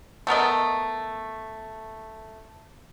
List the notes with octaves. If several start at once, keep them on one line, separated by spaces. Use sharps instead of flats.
A3 B3 A#4 D#5